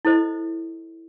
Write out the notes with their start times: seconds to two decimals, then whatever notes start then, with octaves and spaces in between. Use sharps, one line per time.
0.05 E4 A4 C5 D#5